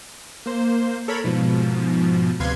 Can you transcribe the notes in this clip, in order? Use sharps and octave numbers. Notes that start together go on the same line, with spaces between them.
A#3 C5
A4 A#4 C#5 B5
G#2 B2 F3
D2 C3 B4 F5 C6 G#6